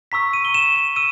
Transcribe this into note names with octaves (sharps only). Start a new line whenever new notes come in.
A#5 C#6 E6 B6
D#7
G7
E7
E7
E6 D#7